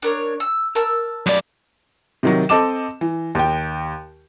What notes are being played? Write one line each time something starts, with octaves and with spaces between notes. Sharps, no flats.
D4 A#4 C#5
E6
A#4 A5 E6
F#2 D5
C3 D#3 F#3
C4 A4 D#5 A5 D6 E7
E3
D#2 G5